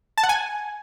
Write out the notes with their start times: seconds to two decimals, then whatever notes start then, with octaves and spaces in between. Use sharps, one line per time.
0.18 A5
0.23 F#5
0.29 G#5